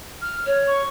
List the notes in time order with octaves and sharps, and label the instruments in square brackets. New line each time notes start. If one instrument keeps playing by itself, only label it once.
[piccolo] F6
[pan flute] C#5
[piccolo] C#6